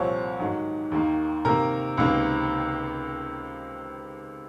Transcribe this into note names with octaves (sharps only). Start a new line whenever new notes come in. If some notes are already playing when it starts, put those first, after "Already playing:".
Already playing: C2 A#2 F3 C4 C#5
G#2 D#3 F#3
D#2 D#3 A#3
C3 D#3 A#3 A#4
C#2 C3 D#3 A#3